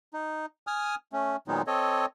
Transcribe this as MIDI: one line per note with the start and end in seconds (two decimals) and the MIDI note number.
0.14 0.46 63
0.67 0.95 80
0.67 0.95 87
0.67 0.95 89
1.13 1.36 57
1.13 1.36 61
1.48 1.62 46
1.48 1.62 51
1.48 1.62 54
1.48 1.62 56
1.48 1.62 59
1.48 1.62 63
1.67 2.06 60
1.67 2.06 69
1.67 2.06 73
1.67 2.06 75